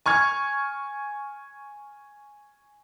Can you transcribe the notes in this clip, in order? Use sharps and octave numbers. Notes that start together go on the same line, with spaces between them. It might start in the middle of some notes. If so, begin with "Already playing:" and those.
G#5 C#6 F6 G#6